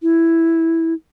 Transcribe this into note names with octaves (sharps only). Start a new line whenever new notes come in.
E4